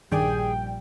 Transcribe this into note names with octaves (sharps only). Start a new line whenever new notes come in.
A#1 G2 D#3 G3 G#4 D5 G5